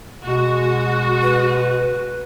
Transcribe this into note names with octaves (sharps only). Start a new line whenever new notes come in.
B2 G#3 F#4
B4